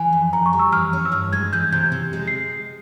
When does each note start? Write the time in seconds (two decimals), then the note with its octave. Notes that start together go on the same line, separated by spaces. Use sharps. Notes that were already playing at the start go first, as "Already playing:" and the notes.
Already playing: E3 G#5
0.13 F2
0.33 F2 A#5
0.46 C#6
0.53 G3
0.59 E6
0.72 E3 F6
0.93 C#4
1.05 E6
1.12 G2 F6
1.33 G#3 G#6
1.53 E3 G6
1.72 C3 G6
1.92 C3
2.13 G#3
2.28 C7